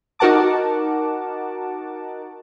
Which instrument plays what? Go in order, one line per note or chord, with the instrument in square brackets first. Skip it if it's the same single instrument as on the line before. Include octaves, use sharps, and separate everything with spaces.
[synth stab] D#4 F#4 A#4 F#5 A5 D6